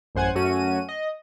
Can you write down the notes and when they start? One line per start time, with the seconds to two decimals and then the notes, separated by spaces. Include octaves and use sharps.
0.15 A1 F#2 C5 F#5 G#5 G#6
0.35 F#2 A3 C#4 F#4 D#7
0.88 D#5